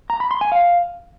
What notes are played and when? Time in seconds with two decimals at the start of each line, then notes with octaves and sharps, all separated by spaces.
0.10 A#5
0.20 B5
0.31 C6
0.41 G#5
0.52 F5